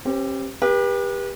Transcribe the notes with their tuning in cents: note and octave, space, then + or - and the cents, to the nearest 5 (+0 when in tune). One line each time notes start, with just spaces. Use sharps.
C#4 -45 G4 +0 B4 +30
G4 +25 B4 -35